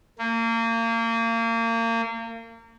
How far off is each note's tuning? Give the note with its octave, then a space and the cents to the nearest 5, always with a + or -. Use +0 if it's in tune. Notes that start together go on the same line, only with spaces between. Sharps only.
A#3 -30